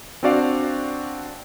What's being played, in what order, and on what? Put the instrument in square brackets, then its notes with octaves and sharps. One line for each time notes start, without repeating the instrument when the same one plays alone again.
[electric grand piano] C4 D4 F#4 D5 F5